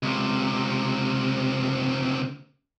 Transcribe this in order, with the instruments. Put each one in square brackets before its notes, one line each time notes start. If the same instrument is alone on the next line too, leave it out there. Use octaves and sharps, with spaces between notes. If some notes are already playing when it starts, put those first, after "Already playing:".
[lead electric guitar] C#2 C3